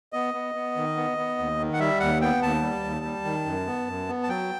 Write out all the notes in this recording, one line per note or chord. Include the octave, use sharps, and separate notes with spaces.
B3 D#5
B3
B3
D#3
B3
B3
D#2
D#3
F#5
G3 E5
D#2 F#5
B3 G5
D#2 A5
G3
D#2
G3
D#3
F#2
B3
F#2
B3
A5
F#3 G5